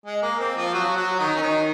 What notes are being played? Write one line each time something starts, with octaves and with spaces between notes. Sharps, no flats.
G#3
A#3
C4
F3 F4
F#3 F#4
F#3 F#4
D#3 D#4
C#4
D#3 D#4